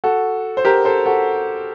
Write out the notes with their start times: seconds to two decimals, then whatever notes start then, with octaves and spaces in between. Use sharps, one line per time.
0.04 F#4 A4
0.57 C5
0.65 G4 A#4
0.85 A4 C5
1.06 F#4 A4